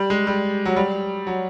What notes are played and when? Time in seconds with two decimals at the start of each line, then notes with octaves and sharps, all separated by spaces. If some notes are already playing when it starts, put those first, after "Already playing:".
Already playing: G3
0.10 G#3
0.27 G3
0.66 F#3
0.76 G3
1.27 F#3